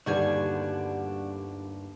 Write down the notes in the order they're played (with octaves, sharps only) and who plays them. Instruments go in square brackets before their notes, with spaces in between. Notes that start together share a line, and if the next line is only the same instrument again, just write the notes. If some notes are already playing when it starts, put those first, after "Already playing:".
[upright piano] G1 D#2 [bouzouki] D3 G3 G#5 [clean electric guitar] D4 F#4 [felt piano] D5